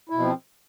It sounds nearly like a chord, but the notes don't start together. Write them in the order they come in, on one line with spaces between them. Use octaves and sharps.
E4 B2 F3 C4